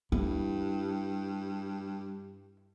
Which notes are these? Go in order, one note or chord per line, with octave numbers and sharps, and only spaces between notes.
G2 E4